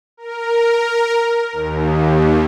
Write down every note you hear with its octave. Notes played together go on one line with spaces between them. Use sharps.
A#4
D#2